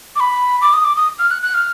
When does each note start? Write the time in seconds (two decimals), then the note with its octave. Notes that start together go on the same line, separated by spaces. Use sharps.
0.16 D6
0.20 B5
0.61 D6
0.73 D#6
0.85 D6
0.96 D#6
1.19 F6
1.31 F#6
1.43 F#6
1.54 F6